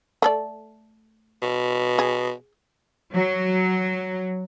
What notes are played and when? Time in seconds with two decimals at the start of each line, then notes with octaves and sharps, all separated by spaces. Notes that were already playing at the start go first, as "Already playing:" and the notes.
0.22 A3 A4 D5
1.42 B2
1.99 G#4
3.14 F#3